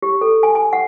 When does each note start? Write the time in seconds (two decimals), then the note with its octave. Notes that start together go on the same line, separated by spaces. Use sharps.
0.02 G4
0.21 A4
0.43 G#5
0.55 G#5
0.73 F#5